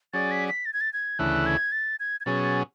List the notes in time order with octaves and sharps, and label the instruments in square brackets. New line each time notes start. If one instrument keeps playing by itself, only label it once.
[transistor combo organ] F#3 C#4 G#4 D5 [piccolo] A6
[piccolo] B6
B6
A6
G#6
A6
G#6
[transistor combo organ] D2 C#3 E3 A3 E4 [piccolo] F#6
[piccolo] G#6
A6
G#6
G#6
[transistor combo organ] B2 F#3 C#4 G#4 [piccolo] A6
[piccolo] A6